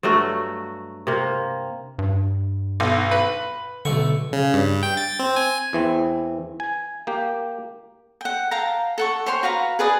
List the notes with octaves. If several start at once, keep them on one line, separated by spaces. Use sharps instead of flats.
G2 F#3 A3 F#4
C3 A#3
G2
B1
B4
B1 D3 A3 C#6
C#3
G2
G5
A6
C4
G#5
E2 E3 C4
G#5
A#3 G4
F#5 G5
F5 G5 A5 A#5
A4 F#5 C#6
C5 C#5 G5 C6
F#4 B4 F5 A#5
G#4 B4 D5 D#6